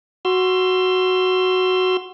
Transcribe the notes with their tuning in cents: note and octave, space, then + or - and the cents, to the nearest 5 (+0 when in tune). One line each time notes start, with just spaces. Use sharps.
F#4 +0 C6 +0 E6 +35